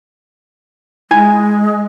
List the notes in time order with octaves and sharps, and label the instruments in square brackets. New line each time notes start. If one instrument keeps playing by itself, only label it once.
[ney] G#3 [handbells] E4 G#5 G#6